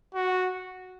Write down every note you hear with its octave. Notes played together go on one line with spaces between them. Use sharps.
F#4